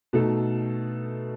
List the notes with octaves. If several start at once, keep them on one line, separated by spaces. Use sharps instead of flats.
B2 A3 D#4 A4